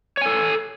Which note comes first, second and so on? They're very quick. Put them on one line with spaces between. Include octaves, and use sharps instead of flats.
C#5 G#5 A4